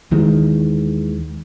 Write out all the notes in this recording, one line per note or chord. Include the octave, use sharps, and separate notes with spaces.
D#2 D#3 E3 G#3